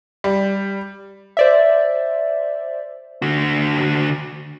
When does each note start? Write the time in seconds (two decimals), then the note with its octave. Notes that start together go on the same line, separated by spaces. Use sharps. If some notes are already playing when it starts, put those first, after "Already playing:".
0.24 G3
1.37 C5 D5 E5
3.22 D3 F#4